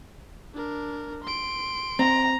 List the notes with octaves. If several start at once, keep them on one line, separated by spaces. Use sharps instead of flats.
D4 A#4
C6 D7
C4 A#5